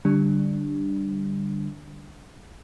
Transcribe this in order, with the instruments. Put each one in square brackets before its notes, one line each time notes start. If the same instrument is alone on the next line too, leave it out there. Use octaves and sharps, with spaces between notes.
[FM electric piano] D3 G3 D4